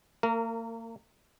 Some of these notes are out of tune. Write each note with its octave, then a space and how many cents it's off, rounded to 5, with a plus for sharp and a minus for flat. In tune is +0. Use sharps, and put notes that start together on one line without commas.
A#3 -40 A#4 -15